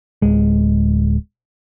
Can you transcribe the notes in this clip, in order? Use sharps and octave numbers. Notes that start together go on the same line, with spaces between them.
D1 G#3